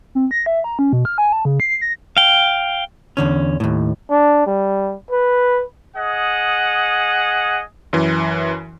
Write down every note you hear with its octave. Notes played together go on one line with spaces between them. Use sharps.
C4
A#6
E5
A#5
C#4
B2
F6
G#5
A5
C#3
C7
A#6
F5 G5
E2 D3 C#4
D#2 A2
D4
G3
B4
G#4 D#5 F#5
F#2 E3